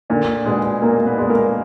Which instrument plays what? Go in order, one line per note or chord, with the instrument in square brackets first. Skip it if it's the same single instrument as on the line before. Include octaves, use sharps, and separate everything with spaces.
[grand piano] A#2 [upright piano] D3 D4
[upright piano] B2 B3 [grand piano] G#3 D4
[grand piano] A#2 [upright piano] A#3 A#4
[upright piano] B3 B4
[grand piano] G#3 D4
[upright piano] A#3 A#4